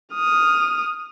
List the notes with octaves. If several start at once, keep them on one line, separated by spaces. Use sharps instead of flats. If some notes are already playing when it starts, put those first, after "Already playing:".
D#6 F6